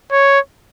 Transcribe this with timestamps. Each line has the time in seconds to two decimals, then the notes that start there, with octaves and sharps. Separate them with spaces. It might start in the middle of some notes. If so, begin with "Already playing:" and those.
0.11 C#5